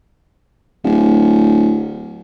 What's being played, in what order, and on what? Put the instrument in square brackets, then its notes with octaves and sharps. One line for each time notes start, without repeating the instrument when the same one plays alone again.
[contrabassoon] D1